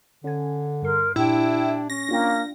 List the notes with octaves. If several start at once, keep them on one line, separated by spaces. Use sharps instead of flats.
D3 C#4 G#5
G2 A#4 C6
A#2 D4 E4 G4 G5 E6
C#4 A#6
A#3 D4 F4 G5